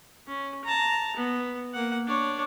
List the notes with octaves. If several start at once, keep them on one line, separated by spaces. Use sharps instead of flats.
C#4
A5 A#5
B3
A#3 F#5
D4 C#5